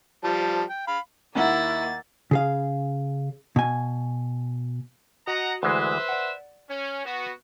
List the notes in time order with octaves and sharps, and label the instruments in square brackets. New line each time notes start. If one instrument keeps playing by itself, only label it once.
[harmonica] F3 G3 A5
G5
F5 B5
[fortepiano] D#2 F#5 [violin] A#3 A6 [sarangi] E4
[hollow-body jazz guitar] C#3 G#4 F5
B2 G#5
[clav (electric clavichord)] F#4 [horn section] D#5 F#5 A#5
[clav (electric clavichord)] D2 E3 G#3 [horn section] B4 C5 E5
[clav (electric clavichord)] D5 F#5
[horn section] C#4
B3 F#4